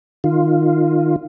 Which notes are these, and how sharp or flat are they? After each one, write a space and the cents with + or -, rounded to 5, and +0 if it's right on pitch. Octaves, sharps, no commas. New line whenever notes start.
D#3 -10 F4 +0